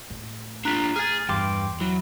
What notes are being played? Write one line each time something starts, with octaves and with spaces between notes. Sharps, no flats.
A2
D4 F4 A#5 F#6 B6
G#4 G#5 F6 A6
E2 G2 G5 C6 D6
F#3 E4